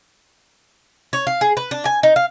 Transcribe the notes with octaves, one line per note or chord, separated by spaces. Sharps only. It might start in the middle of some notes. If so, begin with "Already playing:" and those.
C#5
F5
G#4
B4
D4
G#5
D#4
F5